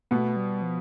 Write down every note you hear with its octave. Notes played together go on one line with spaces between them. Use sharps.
B2 A3 B3
G3
F3